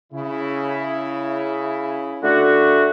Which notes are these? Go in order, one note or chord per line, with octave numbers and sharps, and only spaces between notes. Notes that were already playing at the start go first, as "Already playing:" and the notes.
C#3 E4
D3 A3 F#4